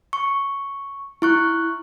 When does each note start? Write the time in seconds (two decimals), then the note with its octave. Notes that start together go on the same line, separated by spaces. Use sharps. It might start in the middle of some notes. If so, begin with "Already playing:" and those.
0.13 C#6
1.22 E4 C#6 F#6